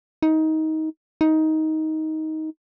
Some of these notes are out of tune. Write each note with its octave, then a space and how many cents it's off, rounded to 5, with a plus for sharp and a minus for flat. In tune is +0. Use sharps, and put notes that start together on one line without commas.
D#4 +20
D#4 +15